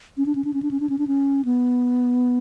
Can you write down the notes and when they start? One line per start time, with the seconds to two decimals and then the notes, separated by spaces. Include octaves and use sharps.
0.17 C#4
0.26 D4
0.35 C#4
0.45 D4
0.54 C#4
0.62 D4
0.71 C#4
0.80 D4
0.89 C#4
0.98 D4
1.07 C#4
1.45 B3